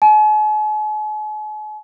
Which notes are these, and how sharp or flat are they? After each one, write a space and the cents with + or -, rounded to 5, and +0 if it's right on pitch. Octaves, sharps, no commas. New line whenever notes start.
G#5 +45